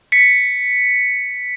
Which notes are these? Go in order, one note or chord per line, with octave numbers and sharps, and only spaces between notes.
B6 C#7